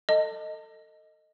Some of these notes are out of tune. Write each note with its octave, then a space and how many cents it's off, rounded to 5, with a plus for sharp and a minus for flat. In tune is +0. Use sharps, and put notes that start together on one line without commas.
A4 +25 D#5 +0 A5 +45